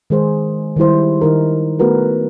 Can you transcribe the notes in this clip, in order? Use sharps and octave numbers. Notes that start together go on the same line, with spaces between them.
D#3 G#3 G#4 C5
D#3 G3 E4 C5
D#3 D#4 A#4
A3 B3 F#4 A#4 B4